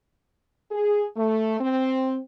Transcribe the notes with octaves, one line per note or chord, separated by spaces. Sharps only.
G#4
A3
C4